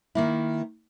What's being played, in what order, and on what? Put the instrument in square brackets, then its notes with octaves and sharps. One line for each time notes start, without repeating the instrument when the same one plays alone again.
[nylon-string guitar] D#3 A#3 E4